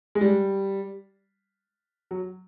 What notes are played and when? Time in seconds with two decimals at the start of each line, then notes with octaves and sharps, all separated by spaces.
0.15 G#3
0.21 G3
2.11 F#3